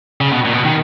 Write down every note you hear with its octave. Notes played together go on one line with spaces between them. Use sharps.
C#3
B2
A#2
B2
D#3